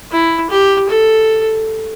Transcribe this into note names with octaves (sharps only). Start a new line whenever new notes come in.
E4
G4
A4